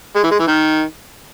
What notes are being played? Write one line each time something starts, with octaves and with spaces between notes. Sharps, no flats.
G#3
E3
G#3
E3
D#3